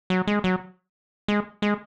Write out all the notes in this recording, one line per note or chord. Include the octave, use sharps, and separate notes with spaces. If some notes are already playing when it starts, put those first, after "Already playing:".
F#3
G#3
F#3
G#3
G#3